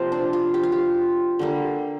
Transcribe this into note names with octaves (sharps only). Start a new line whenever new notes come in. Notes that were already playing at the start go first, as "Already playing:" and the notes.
Already playing: C3 F3 A#3 C5 D5
D4
F4
G4
F4
G4
D3 G3 A#3